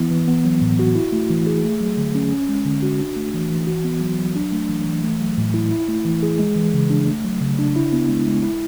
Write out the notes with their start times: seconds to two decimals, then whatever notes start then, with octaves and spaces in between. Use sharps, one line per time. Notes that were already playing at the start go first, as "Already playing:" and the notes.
Already playing: E3 B3 E4
0.11 E3
0.28 B3
0.45 F#3
0.61 A2
0.79 F#4
0.95 E4
1.12 A3
1.30 E3
1.47 G#4
1.64 A3
1.80 F#3
1.97 D3
2.15 C#4
2.32 C#4
2.49 G#3
2.65 D3
2.82 F#4
3.00 D4
3.17 A3
3.34 E3
3.50 E3
3.67 F#4
3.84 B3
4.01 F#3
4.18 F#3
4.36 D4
4.52 A3
4.69 E3
4.86 E3
5.03 A3
5.20 F#3
5.37 A2
5.54 E4
5.71 E4
5.89 A3
6.05 E3
6.23 G#4
6.39 G#3
6.56 E3
6.74 C#3
6.90 D4
7.07 A3
7.25 F#3
7.41 C#3
7.59 D4
7.76 E4
7.93 B3
8.09 G#3
8.27 G#3
8.43 E4